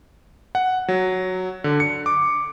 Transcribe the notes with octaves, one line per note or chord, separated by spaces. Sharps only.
F#5
F#3
D3
C#7
D6